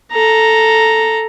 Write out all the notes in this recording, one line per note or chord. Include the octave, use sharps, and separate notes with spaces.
A4 A#5